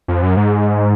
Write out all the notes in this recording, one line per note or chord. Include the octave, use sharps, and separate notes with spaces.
F2
F#2
G#2